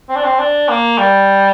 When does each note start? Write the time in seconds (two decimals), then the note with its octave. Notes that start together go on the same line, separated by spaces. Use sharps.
0.09 C4
0.15 D4
0.24 C4
0.39 D4
0.69 A#3
0.98 G3